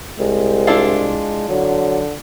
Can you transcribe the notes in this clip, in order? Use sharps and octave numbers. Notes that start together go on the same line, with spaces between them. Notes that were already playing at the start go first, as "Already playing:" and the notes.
C2 G#3
D4 E4 F4
D3 F#3